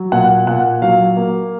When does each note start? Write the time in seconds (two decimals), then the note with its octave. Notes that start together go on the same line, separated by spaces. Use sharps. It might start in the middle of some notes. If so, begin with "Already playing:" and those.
Already playing: F#3
0.12 A#2 F#5
0.47 A#2 F#5
0.82 F#3 F5
1.17 A#3